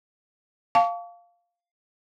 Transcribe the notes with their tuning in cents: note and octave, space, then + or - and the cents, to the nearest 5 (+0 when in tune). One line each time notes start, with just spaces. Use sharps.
F5 +0 A5 +0 C#6 +45